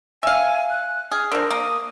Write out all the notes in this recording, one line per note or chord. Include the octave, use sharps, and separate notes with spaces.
E5 F5 G#5
F#6
G#4 F6
D3 F3 A#4
A#3 D#6